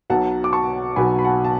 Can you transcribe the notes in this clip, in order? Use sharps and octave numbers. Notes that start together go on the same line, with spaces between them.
B1 B2 F#3 F#5 A5
D6
A5 C#6
B1 B2 F#3 G#5 B5
B5
F#5 A5
A5